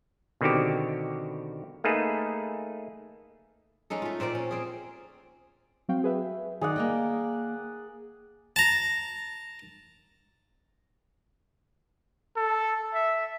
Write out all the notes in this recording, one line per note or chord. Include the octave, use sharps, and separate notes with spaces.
B2 D3 D#3 C4 F#4 G4
A3 A#3 D#4 G#4 B4
G#3 C#4 D#4 A4
A3 F4
A#2 C4 A#4 D5
C#4
C4 G#4
F#3 C4 F#4 F5 G5
G#4 B4 E5
D#3 G#4 D5 F#5
A#3 D#5 G5
A5 A#5
A4
E5